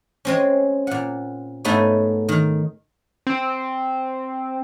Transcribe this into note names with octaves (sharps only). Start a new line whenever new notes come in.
G#3 C4 C#4
A#2 F#5
G#2 A3 B3 D#4 C#5
D#3
C4